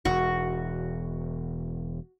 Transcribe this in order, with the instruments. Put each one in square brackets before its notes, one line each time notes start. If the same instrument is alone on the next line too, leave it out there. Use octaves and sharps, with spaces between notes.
[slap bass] E1 [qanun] F#4